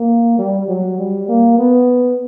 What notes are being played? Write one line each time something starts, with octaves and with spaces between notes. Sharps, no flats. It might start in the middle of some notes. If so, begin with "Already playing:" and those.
Already playing: A#3
G3
F#3
G3
A#3
B3